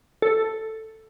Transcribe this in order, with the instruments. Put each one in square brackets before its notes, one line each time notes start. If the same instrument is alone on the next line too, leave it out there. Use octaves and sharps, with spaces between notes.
[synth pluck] A4